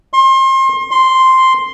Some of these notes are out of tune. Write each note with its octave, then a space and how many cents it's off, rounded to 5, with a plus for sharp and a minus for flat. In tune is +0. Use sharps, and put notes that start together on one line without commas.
C6 +35
C6 +0